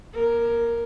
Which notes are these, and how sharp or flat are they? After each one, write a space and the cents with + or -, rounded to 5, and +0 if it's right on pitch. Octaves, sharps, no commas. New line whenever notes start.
A#3 +40 A#4 +0